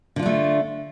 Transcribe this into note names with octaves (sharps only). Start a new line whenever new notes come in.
D3 A3 D4 F4